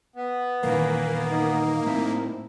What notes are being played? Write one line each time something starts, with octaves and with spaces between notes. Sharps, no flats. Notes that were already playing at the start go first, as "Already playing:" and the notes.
B3
E2 A#2 D#3 E3 A#3
D#4
A2 C4 E4